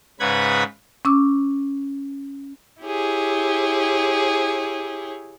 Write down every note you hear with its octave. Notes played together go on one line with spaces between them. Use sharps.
G#2 C#3 B4 F#5 B5 G#6
C#4 D6 E6
E4 G4 G#4 C#5